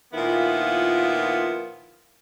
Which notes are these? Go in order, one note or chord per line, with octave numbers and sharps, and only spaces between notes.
A#2 D#3 F3 B3 E4 F4